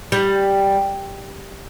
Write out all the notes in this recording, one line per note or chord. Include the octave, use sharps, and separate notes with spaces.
G3